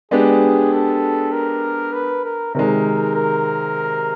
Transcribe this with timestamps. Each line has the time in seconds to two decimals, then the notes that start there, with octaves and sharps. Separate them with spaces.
0.11 G#3 B3 D4 G4 G#4
0.73 A4
1.32 A#4
1.93 B4
2.24 A#4
2.55 C3 D#3 G#3 A#4
3.15 A#4